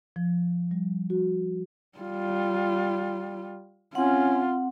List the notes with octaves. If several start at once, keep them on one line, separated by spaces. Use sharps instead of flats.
F3
G3
F#4
G3 F4
C4 C#4 F4 F#5